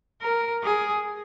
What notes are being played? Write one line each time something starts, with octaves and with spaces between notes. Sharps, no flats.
A#4
G#4